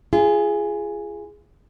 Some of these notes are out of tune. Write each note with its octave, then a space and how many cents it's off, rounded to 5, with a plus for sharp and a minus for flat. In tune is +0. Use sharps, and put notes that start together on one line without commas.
F4 -35 G#4 -5